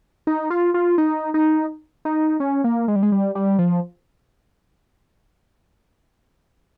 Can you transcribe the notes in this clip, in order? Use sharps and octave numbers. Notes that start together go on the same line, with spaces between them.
D#4
F4
F4
D#4
D#4
D#4
C#4
A#3
G#3
G3
G#3
G3
G3
F3